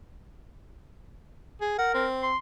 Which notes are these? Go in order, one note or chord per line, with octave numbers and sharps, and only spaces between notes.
G#4
A#4 F#5
C4
C6